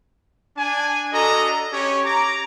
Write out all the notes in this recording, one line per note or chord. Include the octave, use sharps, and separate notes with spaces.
D4 G#5
D4 F#4 A4 D#5 A#5
C#4 G4 C#5
A#5 D6